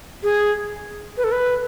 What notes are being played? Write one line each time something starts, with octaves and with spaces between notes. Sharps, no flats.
G#4
B4
A4
B4